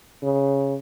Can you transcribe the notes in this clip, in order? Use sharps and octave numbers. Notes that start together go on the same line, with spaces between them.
C#3